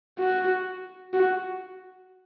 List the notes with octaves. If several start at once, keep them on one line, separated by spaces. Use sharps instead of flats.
F#4
F#4